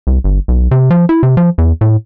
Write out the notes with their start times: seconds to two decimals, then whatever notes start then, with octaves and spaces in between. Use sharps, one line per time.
0.07 C2
0.24 G1
0.48 B1
0.71 C3
0.90 F3
1.09 E4
1.23 C3
1.37 F3
1.58 E2
1.81 A2